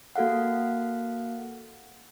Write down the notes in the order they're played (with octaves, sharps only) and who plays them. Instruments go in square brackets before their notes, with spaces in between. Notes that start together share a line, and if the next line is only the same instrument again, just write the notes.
[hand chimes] A#3 F#4 A4 F5 F#5